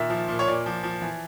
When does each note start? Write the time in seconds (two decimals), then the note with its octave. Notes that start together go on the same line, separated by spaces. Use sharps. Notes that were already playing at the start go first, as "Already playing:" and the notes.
Already playing: A#2 D#3 E5
0.10 F3
0.28 A#2
0.39 C#5
0.48 A#2 D5
0.66 F3
0.83 F3
1.02 E3